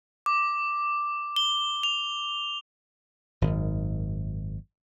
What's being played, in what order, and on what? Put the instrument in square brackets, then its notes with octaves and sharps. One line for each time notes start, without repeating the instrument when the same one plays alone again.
[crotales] D6
G7
F7
[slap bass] G#1 F#2 D#3